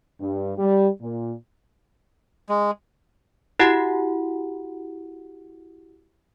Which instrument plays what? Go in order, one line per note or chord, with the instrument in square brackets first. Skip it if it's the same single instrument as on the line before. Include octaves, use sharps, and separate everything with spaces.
[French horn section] G2
G3
A#2
[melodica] G#3
[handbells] E4 F#4 G4 F#5